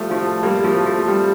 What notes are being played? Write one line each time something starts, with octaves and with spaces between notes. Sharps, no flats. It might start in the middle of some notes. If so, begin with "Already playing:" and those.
Already playing: F3 G3 A3
F3 A3
G3 A#3
F3 A3
F3
G3